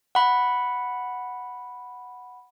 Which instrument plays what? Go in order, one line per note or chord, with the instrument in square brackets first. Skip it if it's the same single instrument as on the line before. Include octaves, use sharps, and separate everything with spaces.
[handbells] F#5 B5